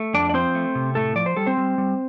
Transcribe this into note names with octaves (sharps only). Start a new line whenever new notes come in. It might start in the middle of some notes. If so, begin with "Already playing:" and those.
Already playing: A3
F2 D4 D5
D5
F3 C4 C5
A3
C3
A2 A3 A4
F3 D5
C5
G3 A4
C4 C5
G3
G3